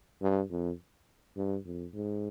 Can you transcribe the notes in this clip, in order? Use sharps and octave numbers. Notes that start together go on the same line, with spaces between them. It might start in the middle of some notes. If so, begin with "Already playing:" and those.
G2
F2
G2
F2
G#2